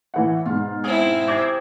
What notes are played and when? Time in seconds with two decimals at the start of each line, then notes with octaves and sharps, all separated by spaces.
0.14 A2 E3 F#5
0.46 G#2 B2 F4
0.84 C4 E4 G#4
1.28 C3 D6 G#6 C7